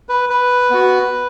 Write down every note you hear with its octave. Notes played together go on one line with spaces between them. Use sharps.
B4
B4
B3 F#4